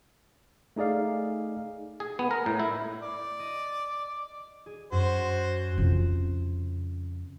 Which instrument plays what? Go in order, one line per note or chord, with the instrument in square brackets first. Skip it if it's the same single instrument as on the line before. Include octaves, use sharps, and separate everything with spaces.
[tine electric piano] A3 D#4 G#4 D5 F5
[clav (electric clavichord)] G#4
B3
A#4
A2
E4
[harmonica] D5
[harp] D#5
G#4
[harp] F#2 [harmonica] F#4 C5
[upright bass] F2 C#3